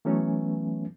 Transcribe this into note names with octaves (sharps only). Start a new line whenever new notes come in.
E3 F#3 A3 B3 C#4